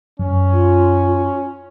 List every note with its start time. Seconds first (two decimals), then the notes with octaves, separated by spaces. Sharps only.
0.19 F#2 C#4
0.53 F4